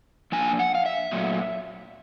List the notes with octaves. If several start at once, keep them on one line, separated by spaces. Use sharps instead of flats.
F3 A#3 D4 G#5
F#5
F5
E5
A#2 F#3 A3